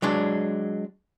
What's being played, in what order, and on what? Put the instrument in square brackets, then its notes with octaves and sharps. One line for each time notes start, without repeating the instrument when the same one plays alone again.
[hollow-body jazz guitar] F#3 G#3 D4